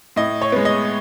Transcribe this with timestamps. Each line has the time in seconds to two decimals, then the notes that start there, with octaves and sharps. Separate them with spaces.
0.16 A2 D#5
0.42 C#5
0.52 G#3 B3
0.65 D#5